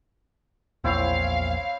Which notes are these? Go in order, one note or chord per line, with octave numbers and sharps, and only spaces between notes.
A#1 E2 A#2 C4 E4 C#5 F5